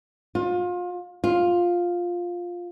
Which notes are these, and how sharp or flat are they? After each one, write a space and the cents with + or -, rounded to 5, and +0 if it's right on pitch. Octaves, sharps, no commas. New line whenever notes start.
F4 +30
F4 +5